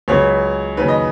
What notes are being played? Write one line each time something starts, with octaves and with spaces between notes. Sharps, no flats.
C#2 C#3 F#3 B3 C#5
D#2 C#3 F#3 B4
D#5